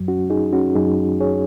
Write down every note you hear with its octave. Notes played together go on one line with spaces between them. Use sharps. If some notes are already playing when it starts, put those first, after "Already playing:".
Already playing: F#2 F#3
C#4 F#4
D#4 G#4
C#4 F#4
F#2 F#3 D#4 G#4
G#4 C#5